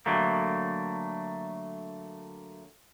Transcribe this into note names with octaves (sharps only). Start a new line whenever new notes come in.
D3 F#3 A3 A#3